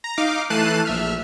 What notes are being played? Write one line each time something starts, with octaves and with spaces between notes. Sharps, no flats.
A#5
D#4 F5 D6
E3 A3 A5 F#6 C7 D#7
A#1 E5 F6